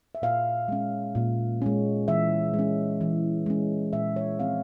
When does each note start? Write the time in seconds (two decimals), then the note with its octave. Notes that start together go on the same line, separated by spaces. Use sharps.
0.15 E5
0.22 A#2 F5
0.68 G#3 C#4
1.15 A#2
1.62 G#3 C#4
2.08 E3 E5
2.54 G#3
2.59 C#4
3.01 E3
3.46 G#3 C#4
3.93 A#2 E5
4.16 C#5
4.39 F3 C4 F5